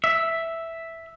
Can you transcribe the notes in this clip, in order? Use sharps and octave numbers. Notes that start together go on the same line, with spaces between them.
E5